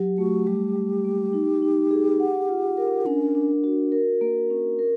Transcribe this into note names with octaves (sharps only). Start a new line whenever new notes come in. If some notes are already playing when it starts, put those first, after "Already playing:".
Already playing: F#3 G4
A3 F#4
G3 G4
G3
A#3
D#4
D#4
G#4
F#5
F4
A#4
C#4 D4
D4
F#4
A#4
A#3
C#4
A#4